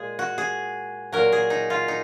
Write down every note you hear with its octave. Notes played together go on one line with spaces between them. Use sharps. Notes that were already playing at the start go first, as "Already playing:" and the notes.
Already playing: A#2 G#3 G#4
F#4
G#4
A#2 F#3 A#4
G#4
D#4
F4
D#4